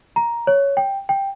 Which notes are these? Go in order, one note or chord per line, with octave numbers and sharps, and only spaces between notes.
A#5
C#5
G5
G5